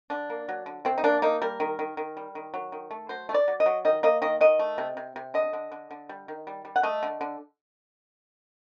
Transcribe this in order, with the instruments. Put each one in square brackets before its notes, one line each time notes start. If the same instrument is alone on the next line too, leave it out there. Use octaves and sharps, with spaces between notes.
[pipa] D3 D4
A#3
F#3
D3
C3 C4
D#4
A#3 D4
A#3 D#4
G3 A#4
D#3
D#3
D#3
G3
D#3
F#3
D#3
A3
F#3 C5
A3
D5
F#3
D#5
F#3
D#3 D#5
A#3 D#5
D#3 D#5
D#3 D#5
A3
C3
C3
C3
D3 D#5
D3
D3
D3
G3
D#3
G3
G3
F#5
A3 D#5
D3
D3